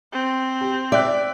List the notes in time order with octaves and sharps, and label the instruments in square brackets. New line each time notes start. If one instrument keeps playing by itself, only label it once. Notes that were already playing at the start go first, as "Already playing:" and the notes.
[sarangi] C4
[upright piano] G4
[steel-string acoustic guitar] D5 [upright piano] E5 G5 F#6